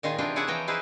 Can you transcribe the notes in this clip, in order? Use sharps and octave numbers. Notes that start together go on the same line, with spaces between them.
A#2 D#3 F4 G#4
C3 D#3 E3 D4 F4 G5
E4 G#4 C#5 D5 F#5
E3 F3 G5 A#5
D#4 E4 G#4 B4 C5